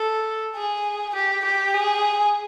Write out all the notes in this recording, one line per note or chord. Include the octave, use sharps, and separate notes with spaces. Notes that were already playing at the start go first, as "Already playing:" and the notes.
Already playing: A4
G#4
G4
G4
G#4